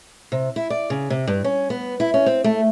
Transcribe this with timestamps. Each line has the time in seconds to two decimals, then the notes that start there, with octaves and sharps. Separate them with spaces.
0.32 C3
0.56 E4
0.70 D5
0.90 C#3
1.10 C3
1.27 G2
1.44 C#4
1.70 B3
2.00 E4
2.14 C#4
2.26 C4
2.44 A3